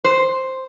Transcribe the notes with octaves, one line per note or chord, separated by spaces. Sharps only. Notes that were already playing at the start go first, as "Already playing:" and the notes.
C5